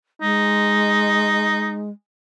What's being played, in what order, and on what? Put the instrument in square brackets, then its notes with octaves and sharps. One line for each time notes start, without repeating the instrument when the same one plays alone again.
[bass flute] G#3 [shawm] D#4